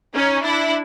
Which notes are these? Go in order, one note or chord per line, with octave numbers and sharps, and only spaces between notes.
C#4 D#4
D4 E4